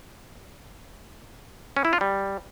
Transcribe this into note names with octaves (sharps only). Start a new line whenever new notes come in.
C#4
E4
F4
G3